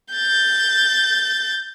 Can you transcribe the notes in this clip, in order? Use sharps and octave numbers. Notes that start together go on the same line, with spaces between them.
G6 A6